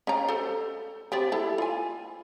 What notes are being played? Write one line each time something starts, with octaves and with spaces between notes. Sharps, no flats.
C#4 F5 A#5
A4 C5
C4 G4 D5
E4 A4
F4 G#5